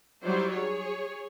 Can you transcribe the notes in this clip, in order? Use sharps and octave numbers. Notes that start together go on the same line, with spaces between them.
F#3 G3 D#4 E4 C5 D5
G#4 C#5